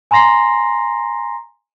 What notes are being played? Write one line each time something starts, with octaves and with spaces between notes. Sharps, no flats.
G#5 A#5 C6 A#6 C7